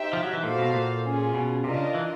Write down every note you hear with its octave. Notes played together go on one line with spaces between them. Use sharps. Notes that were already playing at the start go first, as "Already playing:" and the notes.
Already playing: D#4 G4 C5 E5 G5
F3
F#3
E3
A#2 F#4 A4 C5 F5
B2
A#2
C#4 F4 G#4
B2
C3 D4 F4 A#4 D#5
C#3
E3